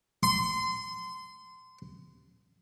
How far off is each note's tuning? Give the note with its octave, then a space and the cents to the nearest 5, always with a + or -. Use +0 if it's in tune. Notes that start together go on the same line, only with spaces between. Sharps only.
C6 -25